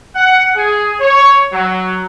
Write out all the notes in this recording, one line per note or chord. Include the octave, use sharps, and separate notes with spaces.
F#5
G#4
C#5
F#3